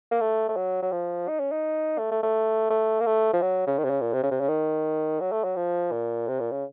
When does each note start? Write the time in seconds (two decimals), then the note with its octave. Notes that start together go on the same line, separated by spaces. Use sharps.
0.11 A#3
0.21 A3
0.49 A3
0.56 F#3
0.82 F#3
0.92 F3
1.28 D#4
1.40 C#4
1.51 D#4
1.99 A3
2.11 A3
2.23 A3
2.70 A3
3.00 A#3
3.06 A3
3.33 F3
3.42 F#3
3.67 C#3
3.78 D#3
3.84 C3
3.90 C#3
4.01 A#2
4.13 C3
4.23 C#3
4.31 C3
4.40 C#3
4.49 D#3
5.20 F#3
5.32 A3
5.44 F#3
5.56 F3
5.91 A#2
6.28 C3
6.40 A#2
6.52 C#3